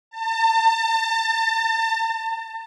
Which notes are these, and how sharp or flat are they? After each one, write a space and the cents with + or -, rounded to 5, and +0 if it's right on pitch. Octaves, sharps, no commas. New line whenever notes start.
A5 +35